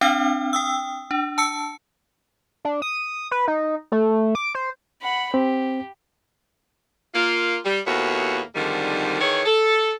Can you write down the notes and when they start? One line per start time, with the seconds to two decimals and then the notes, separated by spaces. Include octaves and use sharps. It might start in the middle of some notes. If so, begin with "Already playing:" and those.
0.01 C4 D4 F5 G5 F6
0.53 G5 D#6 E6
1.11 D4
1.38 A5 E6 C#7
2.65 D4
2.82 D#6
3.31 B4
3.48 D#4
3.92 A3
4.35 D6
4.55 C5
5.02 F#5 B5
5.34 C4 G4
7.14 A#3 F4
7.65 G3
7.86 D#2 A2 A#3 B3 F#4
8.55 F2 G#2 D3 D#3 G3
9.20 D#3 E3 G#4 C#5
9.46 A4